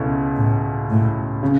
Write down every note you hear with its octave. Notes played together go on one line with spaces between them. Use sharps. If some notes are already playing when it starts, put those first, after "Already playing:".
Already playing: C#2 B2 A3 C#4 E4
A2
A2
C#3